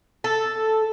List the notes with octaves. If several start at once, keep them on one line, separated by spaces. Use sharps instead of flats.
A4